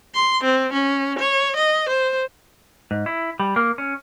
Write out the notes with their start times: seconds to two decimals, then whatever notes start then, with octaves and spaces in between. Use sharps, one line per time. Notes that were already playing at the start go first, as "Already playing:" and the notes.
0.14 C6
0.44 C4
0.73 C#4
1.19 C#5
1.56 D#5
1.89 C5
2.91 G#2
3.06 E4
3.40 G3
3.56 A#3
3.78 C#4